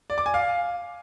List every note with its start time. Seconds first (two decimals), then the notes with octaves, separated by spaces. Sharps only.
0.10 D5
0.18 D6
0.26 G#5
0.34 F5